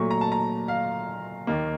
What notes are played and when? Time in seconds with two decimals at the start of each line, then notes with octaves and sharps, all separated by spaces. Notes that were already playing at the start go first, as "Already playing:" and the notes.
Already playing: A#2 F#3 A3 C#6
0.11 A#5
0.21 A5
0.32 A#5
0.68 F5
1.47 D#2 D#3 A#3